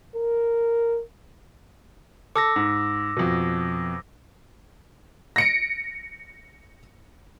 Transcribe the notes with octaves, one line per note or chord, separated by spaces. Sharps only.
A#4
A4 D6 E6 A#6
G#2
F2 B2
A#6 C#7 D7